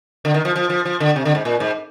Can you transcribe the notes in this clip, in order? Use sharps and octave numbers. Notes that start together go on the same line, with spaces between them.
D3
D#3
F3
F3
F3
F3
D3
C3
D3
G#2
A#2
G#2